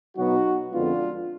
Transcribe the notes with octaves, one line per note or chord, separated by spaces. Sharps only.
B2 F#3 B3 D#4 F#4
F2 D3 G#3 B3 D4 F4